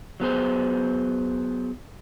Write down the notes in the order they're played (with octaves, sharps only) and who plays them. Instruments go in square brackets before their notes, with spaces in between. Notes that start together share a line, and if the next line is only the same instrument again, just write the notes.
[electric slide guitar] F#3 B3 G#4 C5